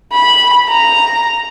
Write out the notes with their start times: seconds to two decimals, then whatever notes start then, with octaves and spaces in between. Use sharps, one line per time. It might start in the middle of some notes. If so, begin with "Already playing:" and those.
0.13 B5
0.69 A#5